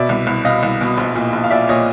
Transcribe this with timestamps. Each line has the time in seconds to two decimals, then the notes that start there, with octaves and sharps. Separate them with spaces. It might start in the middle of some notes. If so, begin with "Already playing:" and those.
Already playing: B2 D5 E5
0.09 C2
0.27 C2
0.45 B2 D#5 F5
0.63 C2
0.81 B2
0.98 A#1
1.15 A#2
1.33 A#1
1.44 F5
1.51 A#2 D5 E5
1.68 A#2 C#5 D#5